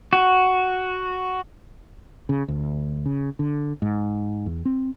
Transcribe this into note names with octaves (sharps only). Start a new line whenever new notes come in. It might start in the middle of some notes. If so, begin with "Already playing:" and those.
F#4
C#3
D2
C#3
D3
G#2
E2
C4